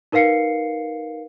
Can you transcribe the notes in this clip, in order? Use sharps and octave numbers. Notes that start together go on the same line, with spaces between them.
D#4 A#4 B4 F5 C7 C#7